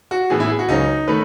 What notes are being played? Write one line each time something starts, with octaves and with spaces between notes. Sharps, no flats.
F#4
A2 E3 B3 G#4
E4
G#4
F#4
C#2 C#3 F#3 C#4 D#4
D#3 A3 C#4 B4